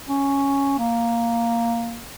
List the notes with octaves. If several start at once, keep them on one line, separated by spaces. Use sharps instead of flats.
C#4
A#3